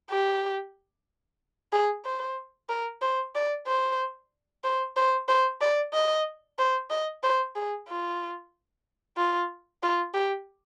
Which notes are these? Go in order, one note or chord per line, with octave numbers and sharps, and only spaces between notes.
G4
G#4
C5
A#4
C5
D5
C5
C5
C5
C5
D5
D#5
C5
D#5
C5
G#4
F4
F4
F4
G4